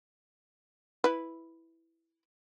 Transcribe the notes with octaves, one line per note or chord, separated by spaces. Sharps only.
E4 B4